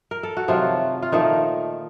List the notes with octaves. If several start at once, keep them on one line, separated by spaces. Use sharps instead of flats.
A#4
A4
F#4
C3 D#3 F3 F#3 A3 F4
F4
A#2 D#3 F3 A3 D#4